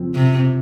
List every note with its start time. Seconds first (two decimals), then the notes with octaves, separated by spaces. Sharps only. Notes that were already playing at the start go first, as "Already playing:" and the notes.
Already playing: F2 C#3 F3 C4
0.15 C3